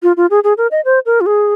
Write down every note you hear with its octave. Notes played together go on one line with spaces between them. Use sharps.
F4
F4
G#4
G#4
A#4
D#5
C5
A#4
F4
G#4